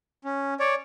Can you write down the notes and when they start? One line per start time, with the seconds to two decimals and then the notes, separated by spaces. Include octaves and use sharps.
0.25 C#4
0.60 C#5 D5